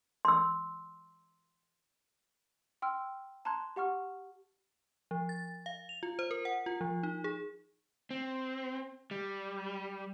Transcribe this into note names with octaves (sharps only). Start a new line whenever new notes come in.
C6 E6
G5 C6 E6 F6
A5 A#5 C6 F#6 G#6
G4 F#5 C#6 F6
F3
A6
F5
F7
F4
C5
A#4
F#5
F4
F3
D#4
G#4
C4
G3